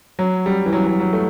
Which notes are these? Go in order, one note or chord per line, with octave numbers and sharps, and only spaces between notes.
F#3
G3
E3
F#3
F#3
F#3
A3